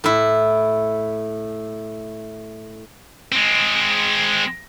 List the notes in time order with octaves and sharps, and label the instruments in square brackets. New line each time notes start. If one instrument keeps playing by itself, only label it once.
[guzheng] A2 E4
[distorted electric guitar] G#3 C4